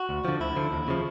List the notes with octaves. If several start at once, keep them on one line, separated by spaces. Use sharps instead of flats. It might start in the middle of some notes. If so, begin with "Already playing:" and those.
Already playing: F#4
D2
D3 F3
D2 E4
D3 F3
D#2
C#3 F3